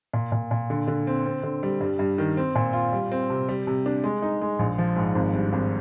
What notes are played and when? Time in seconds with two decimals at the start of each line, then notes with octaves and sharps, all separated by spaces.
0.13 A#2
0.32 A#2
0.51 A#2
0.70 D3
0.88 D3
1.07 C4
1.26 C4
1.43 D3
1.63 G3
1.81 G2
1.99 G2
2.18 D#3
2.37 C4
2.55 A#2
2.73 F4
2.93 G3
3.12 C4
3.30 C3
3.49 G3
3.67 C3
3.86 D4
4.04 G#3
4.22 D#4
4.42 G#3
4.59 A#1
4.78 F3
4.96 G#2
5.15 G#1
5.34 G2
5.53 G#1